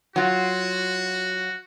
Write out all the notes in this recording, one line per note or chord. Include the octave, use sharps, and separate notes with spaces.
F#3 F4 F#4